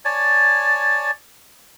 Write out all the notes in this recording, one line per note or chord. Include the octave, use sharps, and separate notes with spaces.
C#5 D5 G#5 A5